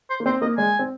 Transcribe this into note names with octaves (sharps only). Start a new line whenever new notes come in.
C5
A#3
C4 C5
A#3 D#5
G#3 G#5
C4